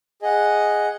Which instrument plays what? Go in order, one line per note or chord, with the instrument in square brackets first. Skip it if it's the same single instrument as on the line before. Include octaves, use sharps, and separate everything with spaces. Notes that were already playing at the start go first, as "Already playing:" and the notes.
[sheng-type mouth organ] G#4 D#5 F#5